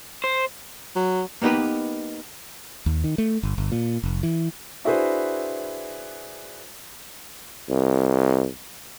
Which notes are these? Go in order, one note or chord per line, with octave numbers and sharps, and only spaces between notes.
C5
F#3
A#3 B3 D#4 G4 B4
D#2
D#3
A3
G1
G1
A#2
F1
E3
D4 E4 F#4 G#4 B4 C5
C2